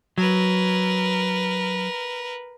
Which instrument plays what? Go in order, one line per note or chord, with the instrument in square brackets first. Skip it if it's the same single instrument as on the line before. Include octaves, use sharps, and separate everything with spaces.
[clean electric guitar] F#3 [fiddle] A#4 B4